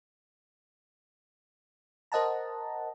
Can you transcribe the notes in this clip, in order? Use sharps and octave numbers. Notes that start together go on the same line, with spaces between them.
A#4 C5 D#5 F#5 A5 A#5